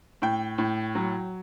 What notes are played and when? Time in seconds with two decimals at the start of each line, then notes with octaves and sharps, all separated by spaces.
0.22 A2 G5
0.58 A2
0.95 F#3